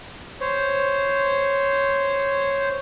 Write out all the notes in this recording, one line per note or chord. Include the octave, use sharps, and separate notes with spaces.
C5 C#5